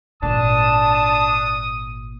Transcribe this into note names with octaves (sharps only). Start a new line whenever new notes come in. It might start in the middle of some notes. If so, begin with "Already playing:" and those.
G#1 A#2 D4 A5 D#6